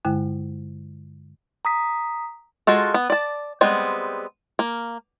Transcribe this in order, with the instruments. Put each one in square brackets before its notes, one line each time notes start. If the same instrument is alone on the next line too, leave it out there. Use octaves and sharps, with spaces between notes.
[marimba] G2 D3 G#3 E4 G5 F#6
[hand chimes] A#5 D#6 B6
[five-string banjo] G#3 F4 F#4 A4
B3
D5 A5
G3 G#3 B3 C4
A#3